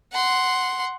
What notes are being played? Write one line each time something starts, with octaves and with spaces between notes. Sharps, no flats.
F#5 C6